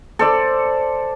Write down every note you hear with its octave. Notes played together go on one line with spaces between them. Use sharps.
A4 C5 D5